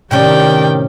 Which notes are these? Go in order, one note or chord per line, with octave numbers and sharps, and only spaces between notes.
A2 C3 D#3 C#4 G4 D5 G5